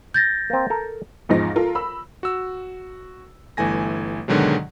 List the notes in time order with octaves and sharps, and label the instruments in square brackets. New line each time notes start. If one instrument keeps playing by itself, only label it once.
[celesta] G6 A6 A#6
[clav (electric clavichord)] A#3 C4
A4 A#4
[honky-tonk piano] E2 G#2 F3 D#4 A#6
F4 A4 A#4
B5 E6
[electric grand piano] F#4 E6
G1 E3 A3 G#5 A#6
G#2 B2 D3 D#3 F#3 G#3